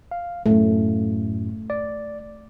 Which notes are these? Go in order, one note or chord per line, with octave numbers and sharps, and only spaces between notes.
F5
F#2 A2 A3
D5